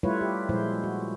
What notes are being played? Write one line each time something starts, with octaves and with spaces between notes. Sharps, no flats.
G3 A3 E4 F4 B4 C#5
G4
A#2 F3 G3 G#3 E4 C5
F#4